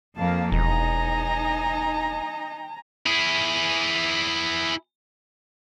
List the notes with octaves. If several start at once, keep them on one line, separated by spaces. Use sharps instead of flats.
F2 A#3 F5 A5
E1 D#4 D#5 G#5 A#5
E4 G#4